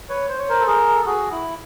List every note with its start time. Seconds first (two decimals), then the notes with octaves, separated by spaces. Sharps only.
0.09 B4 C#5
0.29 C5
0.38 C#5
0.49 A#4 C5
0.60 A4
0.67 G#4 A#4
0.95 A4
1.06 F#4 G#4
1.31 E4